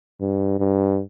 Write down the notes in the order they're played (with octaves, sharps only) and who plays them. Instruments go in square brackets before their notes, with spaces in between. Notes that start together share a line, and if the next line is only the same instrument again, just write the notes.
[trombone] G2
G2